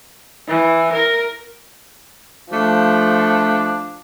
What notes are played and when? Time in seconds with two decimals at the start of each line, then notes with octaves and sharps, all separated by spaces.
0.48 E3
0.93 A#4
2.53 F3 A3 D4